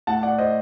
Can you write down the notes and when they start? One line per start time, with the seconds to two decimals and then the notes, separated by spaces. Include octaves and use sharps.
0.07 A2 F#5 A5
0.23 D5 F#5
0.38 C5 D#5